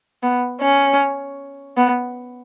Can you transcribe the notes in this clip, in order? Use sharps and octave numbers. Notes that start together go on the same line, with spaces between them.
B3
C#4
B3